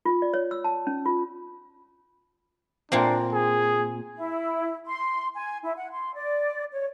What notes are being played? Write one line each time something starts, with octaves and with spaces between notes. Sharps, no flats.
F4
D5
C#5
E6
A5
C#4
F4
A#2 A#3 C4 D4
G#4
E4
C6
G#5
E4
F#5
C6
D5
C#5